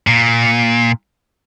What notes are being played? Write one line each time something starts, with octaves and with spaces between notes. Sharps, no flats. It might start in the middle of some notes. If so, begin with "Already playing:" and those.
A#2